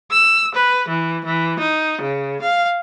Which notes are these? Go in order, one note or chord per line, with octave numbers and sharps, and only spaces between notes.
E6
B4
E3
E3
D#4
C#3
F5